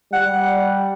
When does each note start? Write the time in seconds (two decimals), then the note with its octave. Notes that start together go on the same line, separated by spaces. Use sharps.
0.13 G3 F#5